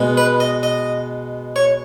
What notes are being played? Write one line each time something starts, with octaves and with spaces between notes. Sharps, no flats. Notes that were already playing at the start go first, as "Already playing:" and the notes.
Already playing: B2 G#3 B3
B4
D#5
D#5
C#5